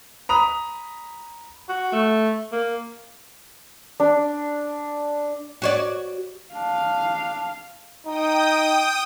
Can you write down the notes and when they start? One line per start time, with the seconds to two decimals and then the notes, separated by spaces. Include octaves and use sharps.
0.29 A#5 B5 D#6 F7
1.69 F#4
1.92 A3
2.52 A#3
4.00 D4
5.62 F#4 C#5 D5
6.54 D4 F5
8.06 D#4 G5 D#6